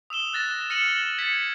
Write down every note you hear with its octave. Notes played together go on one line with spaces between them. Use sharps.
D#6 E6 E7 G7
F#6 A6 A#6 E7
F6 A#6 C#7 D#7 E7 F#7
G#6 A6 B6 C#7